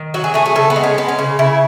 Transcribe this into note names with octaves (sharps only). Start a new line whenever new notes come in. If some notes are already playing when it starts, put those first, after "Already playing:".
Already playing: D#3
F#3 F#4
G#4
A3 G#4
G#4
C#3 A4
B3
G#3
C#4
G#3 B3
C#4
C#3
C#3 E4